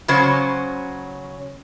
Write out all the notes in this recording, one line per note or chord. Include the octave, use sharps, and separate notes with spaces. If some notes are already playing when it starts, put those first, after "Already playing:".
C#3 F#3 C#4 C5